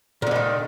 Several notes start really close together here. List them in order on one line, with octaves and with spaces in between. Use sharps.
A#2 D3 G#3 D#3